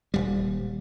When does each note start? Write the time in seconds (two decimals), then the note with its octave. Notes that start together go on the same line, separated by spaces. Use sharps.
0.14 D#1 G3